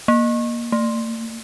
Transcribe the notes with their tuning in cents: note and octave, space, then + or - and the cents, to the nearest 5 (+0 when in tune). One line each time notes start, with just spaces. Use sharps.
A#3 +15
A#3 -45